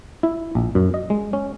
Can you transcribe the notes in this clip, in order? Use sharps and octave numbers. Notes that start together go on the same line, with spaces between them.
E4
A#1
F#2
D#5
G#3
C#4